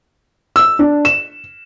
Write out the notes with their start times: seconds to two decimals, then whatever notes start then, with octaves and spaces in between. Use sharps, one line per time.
0.56 E6
0.79 D4
1.05 E7